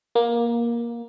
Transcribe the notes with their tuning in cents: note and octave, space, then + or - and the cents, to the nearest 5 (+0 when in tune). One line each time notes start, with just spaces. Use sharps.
A#3 +15